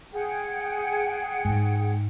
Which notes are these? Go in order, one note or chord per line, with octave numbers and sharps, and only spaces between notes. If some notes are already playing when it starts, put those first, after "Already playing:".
G#4 F#5 G5
G#2